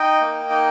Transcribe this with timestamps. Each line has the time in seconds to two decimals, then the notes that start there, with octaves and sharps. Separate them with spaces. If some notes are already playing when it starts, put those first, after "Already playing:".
Already playing: D#4 D#5 G5
0.21 A#3
0.50 D#4